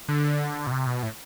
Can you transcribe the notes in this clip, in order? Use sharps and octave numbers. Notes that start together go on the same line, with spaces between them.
D3
B2
C3
B2
A2